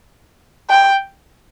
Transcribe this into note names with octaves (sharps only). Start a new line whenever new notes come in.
G5